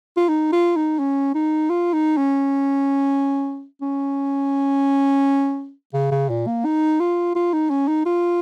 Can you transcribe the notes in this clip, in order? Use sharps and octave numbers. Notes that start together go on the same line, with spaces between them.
F4
D#4
F4
D#4
C#4
D#4
F4
D#4
C#4
C#4
C#3
C#3
A#2
A#3
D#4
F4
F4
D#4
C#4
D#4
F4